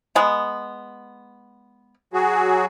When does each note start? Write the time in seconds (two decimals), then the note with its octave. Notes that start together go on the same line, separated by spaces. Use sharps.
0.15 G#3 B3
2.13 F#3 F#4 G#4